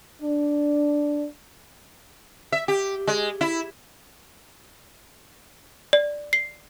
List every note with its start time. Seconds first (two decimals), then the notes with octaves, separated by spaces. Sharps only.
0.21 D4
2.52 E5
2.68 G4
3.07 G#3
3.41 E4
5.93 D5
6.33 C7